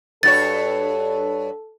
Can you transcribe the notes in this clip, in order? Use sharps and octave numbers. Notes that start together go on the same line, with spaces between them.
G2 F#4 A4 C#5 A6